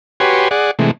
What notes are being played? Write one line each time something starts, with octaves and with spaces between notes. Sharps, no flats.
F#4 G4 B4 C#5 G#5 C6
G#4 D5 F#5
C3 E3 G#3 A3